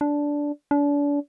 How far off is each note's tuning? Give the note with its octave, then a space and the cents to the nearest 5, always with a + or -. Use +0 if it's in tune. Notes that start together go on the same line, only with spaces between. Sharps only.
D4 -10
D4 -35